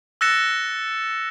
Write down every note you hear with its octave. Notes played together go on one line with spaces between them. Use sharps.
E6 F#6 A6 A#6 C#7 E7